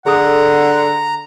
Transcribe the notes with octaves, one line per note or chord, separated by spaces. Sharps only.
D3 G#4 A4 F#5 A#5 D#6